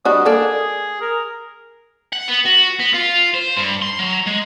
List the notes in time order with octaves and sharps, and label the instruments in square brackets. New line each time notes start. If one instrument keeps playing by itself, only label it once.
[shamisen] G3 D4 F#4 [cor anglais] D#5
[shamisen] A#3 A4 D5 [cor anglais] G#4
[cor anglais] A#4
[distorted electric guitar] F#5
B3
F#4
B3
F4
C5
G2
C6
F#3
G#3